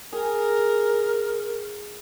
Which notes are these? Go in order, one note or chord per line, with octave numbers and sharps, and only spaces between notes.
G#4 A#4